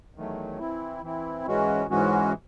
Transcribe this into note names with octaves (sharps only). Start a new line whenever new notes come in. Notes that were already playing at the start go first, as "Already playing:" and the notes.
E2 D#3 F#3 A3
E3 C4 E4
E3 C4 E4
G#2 E3 G#3 C#4 F#4
G#2 E3 G#3 C#4 F#4